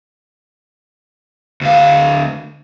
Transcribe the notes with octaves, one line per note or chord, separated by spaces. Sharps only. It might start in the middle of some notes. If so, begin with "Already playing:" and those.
D2 F5